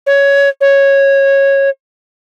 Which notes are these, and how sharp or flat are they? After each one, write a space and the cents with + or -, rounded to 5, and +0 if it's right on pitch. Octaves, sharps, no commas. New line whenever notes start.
C#5 +15
C#5 -10